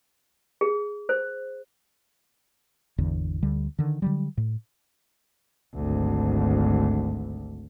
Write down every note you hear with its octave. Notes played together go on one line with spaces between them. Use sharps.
G#4
C5
G#1 E2 D3
D2 D3 G3
D3 D#3
D3 F#3 G3
A2
G#1 D2